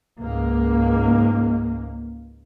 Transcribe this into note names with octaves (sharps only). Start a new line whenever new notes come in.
C#2 G#2 A#3